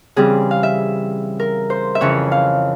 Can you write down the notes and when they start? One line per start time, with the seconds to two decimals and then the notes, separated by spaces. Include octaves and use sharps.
0.16 C#3 E3 G3 C4 G#4
0.51 F5
0.63 E5
1.40 A#4
1.70 C5
1.95 E5
2.01 F2 C#3 E3 C#5
2.32 F5